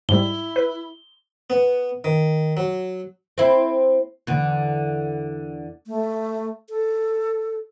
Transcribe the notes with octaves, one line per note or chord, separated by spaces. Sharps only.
G#2 G3 E4 G7
B4
B3
D#3
F#3
C4 E4
E2 D3
A3
A4